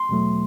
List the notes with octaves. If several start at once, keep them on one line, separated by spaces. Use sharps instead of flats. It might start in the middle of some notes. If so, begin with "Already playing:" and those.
Already playing: C6
E2 B2 F#3 A3